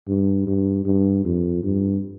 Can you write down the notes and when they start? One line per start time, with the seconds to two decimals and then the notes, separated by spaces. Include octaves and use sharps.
0.08 G2
0.47 G2
0.85 G2
1.25 F2
1.64 G2